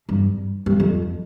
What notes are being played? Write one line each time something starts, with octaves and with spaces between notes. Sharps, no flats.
G2
G2
F2